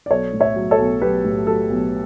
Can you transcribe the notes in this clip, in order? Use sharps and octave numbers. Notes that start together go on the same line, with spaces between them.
D5
B1 A4 C#5
A2
C#5 E5
F#3
A4 C#5
B1
B1 G4 B4
A2
F#3 A4
B1